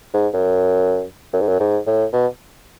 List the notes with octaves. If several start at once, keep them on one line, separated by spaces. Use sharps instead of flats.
G#2
F#2
F#2
G#2
F#2
G#2
A2
B2